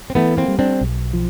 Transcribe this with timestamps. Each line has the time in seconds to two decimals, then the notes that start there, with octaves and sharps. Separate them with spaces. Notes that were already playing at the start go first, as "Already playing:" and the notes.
0.10 C4
0.15 E3 A3 B3
0.37 A#3 C4
0.48 G3
0.59 C4 D4
0.81 B1
1.13 F3